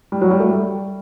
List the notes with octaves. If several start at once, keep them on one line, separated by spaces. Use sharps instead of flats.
G3
F#3
G3
A3
G3